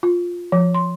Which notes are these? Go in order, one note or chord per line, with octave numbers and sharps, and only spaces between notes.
F4
F3
C6